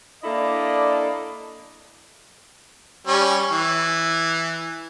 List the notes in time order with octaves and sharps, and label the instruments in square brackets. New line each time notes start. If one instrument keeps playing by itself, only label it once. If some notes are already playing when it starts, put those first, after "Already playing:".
[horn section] A#3 D4 E4 A4 D5 D#5
[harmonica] G3 C#4
E3